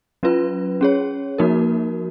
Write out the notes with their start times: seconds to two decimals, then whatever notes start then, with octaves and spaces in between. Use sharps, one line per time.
0.23 F#3 C#4 F4 B4
0.81 C#4 G#4 C#5
1.38 F3 A#3 D#4 F#4 A#4